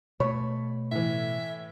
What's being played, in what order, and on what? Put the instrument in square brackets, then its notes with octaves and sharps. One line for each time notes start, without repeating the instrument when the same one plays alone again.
[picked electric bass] B2 A3 [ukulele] C#5 [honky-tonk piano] B5
[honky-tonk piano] A2 E3 [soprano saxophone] E5